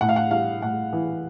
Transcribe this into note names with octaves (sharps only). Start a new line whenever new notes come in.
A2 F#5
F5
F#5
G3 F5
A2 F#5
E3